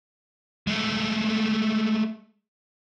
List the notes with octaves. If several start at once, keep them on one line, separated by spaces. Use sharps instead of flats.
G#3 A3